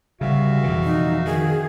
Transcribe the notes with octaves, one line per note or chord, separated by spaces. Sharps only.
C#3 G3 F#4 E5 F5
F2 B2 E3
D#4
D#3 G#4